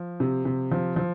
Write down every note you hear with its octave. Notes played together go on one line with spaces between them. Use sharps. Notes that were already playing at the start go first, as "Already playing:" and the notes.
Already playing: F3
C3
C3
F3
F3